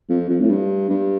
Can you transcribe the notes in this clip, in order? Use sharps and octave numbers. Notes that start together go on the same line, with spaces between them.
F2
F2
A2
G2
G2